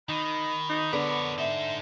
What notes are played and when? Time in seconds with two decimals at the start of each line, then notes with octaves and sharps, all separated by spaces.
0.09 D#3 D#4 B5
0.70 D#4
0.93 D3 B3 A#4 C#5
1.38 D#4 C5 E5